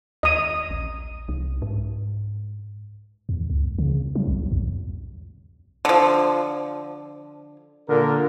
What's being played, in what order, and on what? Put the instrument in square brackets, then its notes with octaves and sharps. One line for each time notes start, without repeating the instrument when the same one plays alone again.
[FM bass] D#2 [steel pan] D#5 D#6
[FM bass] A#1
C2
G#2
[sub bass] E2
C#2
C#3
F#3
B1
E2
[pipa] D3 F3
[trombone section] A#2 D3 A#4